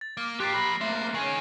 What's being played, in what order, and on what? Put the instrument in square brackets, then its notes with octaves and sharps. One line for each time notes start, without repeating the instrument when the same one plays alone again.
[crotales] A6
[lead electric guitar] A#3 [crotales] D6 F6
[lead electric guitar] F3 A#3 [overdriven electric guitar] G4 [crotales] F#6 A6 C7
[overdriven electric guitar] B5 [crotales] F#6 A#6
[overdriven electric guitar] A3 A#3 [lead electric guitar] C5
[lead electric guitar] D#3 [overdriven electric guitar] G#4 C#5